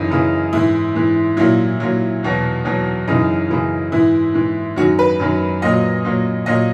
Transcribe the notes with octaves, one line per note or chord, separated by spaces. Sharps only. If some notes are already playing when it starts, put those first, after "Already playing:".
Already playing: F#2 C#3 E3 D#4
F#2 C#3 E3
G#2 E3 E4
G#2 E3
A#2 F#3 E4
A#2 F#3
E2 B2 F#3
E2 B2 F#3
F#2 C#3 E3 D#4
F#2 C#3 E3
G#2 E3 E4
G#2 E3
F#2 D#3 F#3 F#4
B4
F#2 D#3 F#3
A#2 F#3 D#5
A#2 F#3
A#2 F#3 D#5